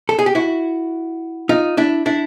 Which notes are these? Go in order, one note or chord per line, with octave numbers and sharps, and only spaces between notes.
A4
G#4
G4
E4 F#4
D#4 F4
D4 E4
D4 E4